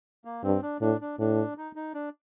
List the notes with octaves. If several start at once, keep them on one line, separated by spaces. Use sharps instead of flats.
A#3
G2 C4
D4
A2 D4
D4
A2 D4
D#4
D#4
D4